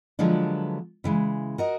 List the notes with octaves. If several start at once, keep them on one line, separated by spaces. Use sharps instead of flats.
D3 F3 F#3 G#3 B3 D4
C#3 E3 G#3
F#4 A#4 D#5